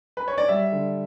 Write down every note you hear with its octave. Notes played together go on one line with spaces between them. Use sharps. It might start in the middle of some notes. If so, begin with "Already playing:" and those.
B4
C#5
D5
G3 E5
D3